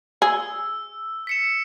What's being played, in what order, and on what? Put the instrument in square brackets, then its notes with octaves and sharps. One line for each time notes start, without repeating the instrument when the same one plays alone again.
[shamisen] G#4 [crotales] E6
[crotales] B6 C#7 E7